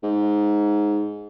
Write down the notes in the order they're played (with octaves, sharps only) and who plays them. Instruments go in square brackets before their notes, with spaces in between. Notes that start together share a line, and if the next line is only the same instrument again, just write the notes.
[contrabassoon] G#2